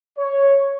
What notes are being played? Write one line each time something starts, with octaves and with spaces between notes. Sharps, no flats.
C#5